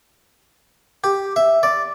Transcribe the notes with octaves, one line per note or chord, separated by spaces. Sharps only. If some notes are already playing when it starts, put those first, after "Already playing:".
G4
E5
D5